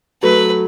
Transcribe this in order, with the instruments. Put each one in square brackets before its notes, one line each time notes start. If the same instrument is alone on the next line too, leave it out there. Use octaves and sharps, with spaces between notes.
[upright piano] F#3 A3 [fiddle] B4